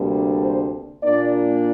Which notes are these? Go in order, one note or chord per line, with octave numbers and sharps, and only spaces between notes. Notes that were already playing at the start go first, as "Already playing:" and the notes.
Already playing: D2 C3 G3 A#3 D4
C5
A#2 A#3 D4 D5